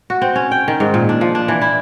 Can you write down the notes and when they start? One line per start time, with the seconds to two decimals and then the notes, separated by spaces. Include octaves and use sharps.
0.10 F#4
0.22 C4
0.36 C#4
0.51 G5
0.68 D#3
0.80 G#2
0.94 A#2
1.09 D4
1.21 F3
1.35 D4
1.48 E3
1.61 E4